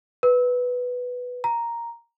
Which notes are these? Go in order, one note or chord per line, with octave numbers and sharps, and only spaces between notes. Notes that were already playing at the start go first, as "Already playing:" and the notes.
B4
A#5